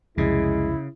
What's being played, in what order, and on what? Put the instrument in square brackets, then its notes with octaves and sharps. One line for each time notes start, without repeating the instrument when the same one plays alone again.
[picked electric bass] C2 F2 [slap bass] C#3 [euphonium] G#3 [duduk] E4